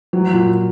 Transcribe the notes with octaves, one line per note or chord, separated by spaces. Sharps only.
F#3
A#2